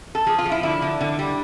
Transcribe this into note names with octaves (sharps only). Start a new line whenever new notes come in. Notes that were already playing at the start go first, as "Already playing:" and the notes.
A4
F3 G#4
F4
F3
E4
D3 E4
D3
D3
G3